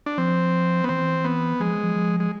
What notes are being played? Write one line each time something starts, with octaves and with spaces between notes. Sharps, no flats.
D4
F3 C4
B3
E3 C4
B3
F3 G#3
F3
F3
G#3